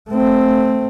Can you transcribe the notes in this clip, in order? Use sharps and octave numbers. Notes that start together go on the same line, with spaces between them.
A3 C4